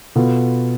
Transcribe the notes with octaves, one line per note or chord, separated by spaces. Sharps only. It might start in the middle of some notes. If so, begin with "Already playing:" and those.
B2 B3 F4 A4